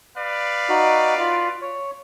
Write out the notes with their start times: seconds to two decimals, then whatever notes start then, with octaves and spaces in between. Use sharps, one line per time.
0.17 B4 D5 F5
0.69 D#4 F#4
1.19 F4
1.61 C#5